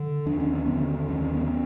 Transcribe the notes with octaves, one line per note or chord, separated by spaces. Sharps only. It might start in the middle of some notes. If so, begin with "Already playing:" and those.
Already playing: D3
D#2 D4
C#4
C4
D3 B3 C#4
D#2 C#4
C4
B3 C#4